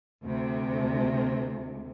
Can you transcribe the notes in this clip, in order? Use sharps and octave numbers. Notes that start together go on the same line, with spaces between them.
D2 C3